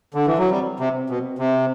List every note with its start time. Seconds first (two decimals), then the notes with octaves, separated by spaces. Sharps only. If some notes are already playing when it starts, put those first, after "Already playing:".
0.14 D3
0.27 E3
0.38 F#3
0.50 G3 C4
0.80 C3
0.94 C4
1.10 B2
1.39 C3 C4